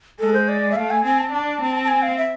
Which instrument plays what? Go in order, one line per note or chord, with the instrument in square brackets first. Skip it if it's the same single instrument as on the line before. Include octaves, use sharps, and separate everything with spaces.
[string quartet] G#3 [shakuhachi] A4
[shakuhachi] C5
D5
E5
[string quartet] A3 [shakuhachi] F5
[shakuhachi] G#5
[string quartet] C4 [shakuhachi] G#5
[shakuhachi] A5
[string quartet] D4
C4
[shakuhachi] A5
G#5
F5
E5